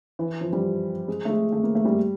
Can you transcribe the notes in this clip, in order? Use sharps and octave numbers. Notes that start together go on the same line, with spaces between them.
E3
F3
G3
G#3
A3
G#3
A3
A#3
A3
G3